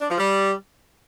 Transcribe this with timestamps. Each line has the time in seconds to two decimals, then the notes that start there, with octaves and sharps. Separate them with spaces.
0.01 D4
0.10 F3
0.18 G3